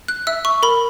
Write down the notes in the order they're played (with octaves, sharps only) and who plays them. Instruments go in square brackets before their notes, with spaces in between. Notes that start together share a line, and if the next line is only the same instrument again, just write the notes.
[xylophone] F#6
E5 E6
C#6
A#4 B5